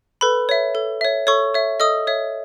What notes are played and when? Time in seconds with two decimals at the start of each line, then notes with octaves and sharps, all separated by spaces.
0.21 A4 B4 B5
0.49 C#5 E5
0.75 A4
1.01 C#5 E5
1.27 A4 C#5 C#6
1.54 C#5 E5
1.80 A4 D#5 D#6
2.07 C#5 E5